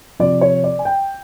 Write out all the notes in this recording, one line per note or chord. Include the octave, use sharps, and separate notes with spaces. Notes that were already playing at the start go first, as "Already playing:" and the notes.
C3 F3 D5
C#5
D5
G#5
G5